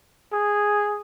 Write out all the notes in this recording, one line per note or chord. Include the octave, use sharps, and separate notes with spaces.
G#4